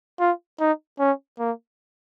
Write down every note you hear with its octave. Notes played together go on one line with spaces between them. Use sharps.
F4
D#4
C#4
A#3